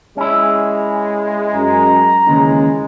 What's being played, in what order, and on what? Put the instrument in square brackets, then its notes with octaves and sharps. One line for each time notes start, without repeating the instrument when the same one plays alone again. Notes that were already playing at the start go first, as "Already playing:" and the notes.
[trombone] G#3 [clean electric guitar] C#4 E4
[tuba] F#2 [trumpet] A#5
[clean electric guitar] D#2 E3 [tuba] C#3 [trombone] G#3